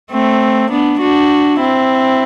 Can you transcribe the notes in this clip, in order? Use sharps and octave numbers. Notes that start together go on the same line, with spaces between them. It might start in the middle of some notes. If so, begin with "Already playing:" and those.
A3 C4
B3 D4
D4 F#4
C4 E4